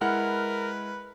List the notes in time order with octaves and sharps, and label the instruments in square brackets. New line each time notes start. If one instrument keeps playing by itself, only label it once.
[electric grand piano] G#3 E4 F6 [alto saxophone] A#4 [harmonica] B4 [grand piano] F#5